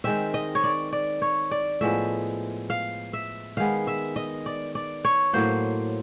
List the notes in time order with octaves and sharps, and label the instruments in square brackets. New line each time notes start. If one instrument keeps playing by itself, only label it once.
[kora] D#3 G#3 C4 E5
D#5
C#5
D5
D5
C#5
D5
A2 F3 G#3 B3 E5
F5
E5
D#3 G#3 B3 F5
E5
D#5
D5
D5
C#5
A2 F#3 A#3 C5